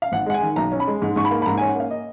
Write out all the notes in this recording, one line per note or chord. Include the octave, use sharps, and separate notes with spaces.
F5
G#1 F#5
G#3 F#5
G#5
D#3
B1 A#5
C#4
B5
G#3
G#2
G#2 C#6
B5
A#3
B5
G#2 A#5
G#5
C#4
F#5
A#3 F5
D#5